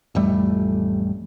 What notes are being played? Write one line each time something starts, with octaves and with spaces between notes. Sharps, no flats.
A1 F2 G3 A3